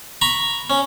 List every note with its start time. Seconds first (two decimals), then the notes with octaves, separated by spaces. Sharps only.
0.21 A#5 B5 C#6
0.70 C#4